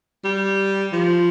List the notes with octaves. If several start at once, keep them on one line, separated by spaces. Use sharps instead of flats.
G3
F3